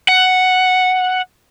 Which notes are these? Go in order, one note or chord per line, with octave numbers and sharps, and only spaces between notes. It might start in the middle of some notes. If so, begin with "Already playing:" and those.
F#5